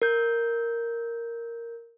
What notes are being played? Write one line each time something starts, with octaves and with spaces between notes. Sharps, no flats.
A#4 G6